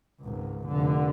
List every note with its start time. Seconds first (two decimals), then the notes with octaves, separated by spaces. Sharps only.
0.20 G#1 C#2
0.68 F1 D3